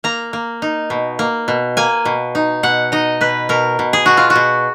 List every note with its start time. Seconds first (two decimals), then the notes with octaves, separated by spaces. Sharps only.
0.04 A#3 A#5
0.33 A#3
0.62 D#4
0.90 B2
1.19 A#3
1.48 B2
1.77 A#3 G#5
2.05 B2
2.35 D#4
2.63 B2 F#5
2.92 D#4 D#5
3.21 B2 B4
3.49 B2 A#4
3.79 B2
3.93 G#4
4.06 B2 F#4
4.17 F4
4.30 F#4
4.36 B2